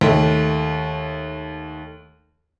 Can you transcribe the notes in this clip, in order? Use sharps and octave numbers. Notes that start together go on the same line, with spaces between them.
D#2 A3